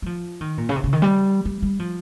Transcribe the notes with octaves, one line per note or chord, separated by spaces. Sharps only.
G3
F3
D#3
A#2
C#3
C3
C#3
D#3
G3
G3
G3
F3